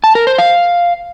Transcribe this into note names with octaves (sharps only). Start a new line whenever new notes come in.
A5
A#4
C5
F5